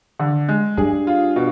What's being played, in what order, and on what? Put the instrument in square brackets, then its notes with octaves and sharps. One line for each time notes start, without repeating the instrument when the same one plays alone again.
[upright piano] D3
G#3
[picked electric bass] G2 [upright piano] G#4
[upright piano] F4
B2